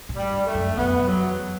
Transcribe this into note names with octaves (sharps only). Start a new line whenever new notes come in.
A2
G3
G2
A3
F#2
F#2 B3
F#2
F#3
E2